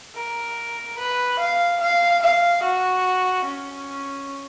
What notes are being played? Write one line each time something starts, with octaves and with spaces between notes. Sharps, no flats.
A#4
B4
F5
F5
F5
F#4
C#4